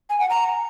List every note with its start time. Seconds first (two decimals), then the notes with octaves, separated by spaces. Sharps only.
0.10 G#5
0.20 F#5
0.30 A#5